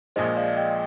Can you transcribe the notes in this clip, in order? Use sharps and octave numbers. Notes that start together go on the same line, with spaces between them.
A#1 A#2 F3 G#3 C5 D#5
D5 F5
D#5 G5